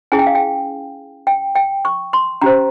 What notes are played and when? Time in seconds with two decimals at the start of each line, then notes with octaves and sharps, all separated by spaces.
0.12 C#4 E4 G#4 G#5
0.19 G5
0.27 F5
0.35 G5
1.27 G5
1.55 G5
1.85 C#6
2.13 C6
2.41 C#4 G4 C5 A#5